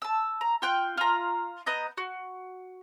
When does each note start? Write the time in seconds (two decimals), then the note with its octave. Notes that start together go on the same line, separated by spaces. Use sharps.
0.02 A5 E6
0.41 A#5
0.62 F4 G5 F#6
0.97 F4 A#5
1.66 B3 D#5 A#5 G6
1.97 F#4